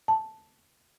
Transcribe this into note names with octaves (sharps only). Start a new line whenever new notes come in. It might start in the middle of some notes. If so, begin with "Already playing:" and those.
A5